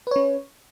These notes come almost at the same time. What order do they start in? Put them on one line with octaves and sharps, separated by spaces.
B4 C#5 C#4